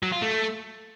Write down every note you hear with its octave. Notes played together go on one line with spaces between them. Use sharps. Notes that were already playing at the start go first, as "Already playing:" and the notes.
F#3
F4
A3